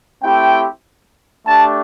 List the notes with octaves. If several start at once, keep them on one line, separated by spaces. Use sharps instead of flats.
A3 C4 E4 G4 G5
A3 D4 G4 A5